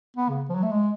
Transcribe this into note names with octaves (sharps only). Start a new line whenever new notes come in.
B3
C#3
F3
F#3
A3
G#3